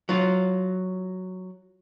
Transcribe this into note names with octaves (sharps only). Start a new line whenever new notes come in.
F#3 F4